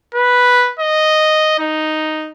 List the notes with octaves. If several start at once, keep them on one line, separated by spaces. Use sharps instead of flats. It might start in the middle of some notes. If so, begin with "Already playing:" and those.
B4
D#5
D#4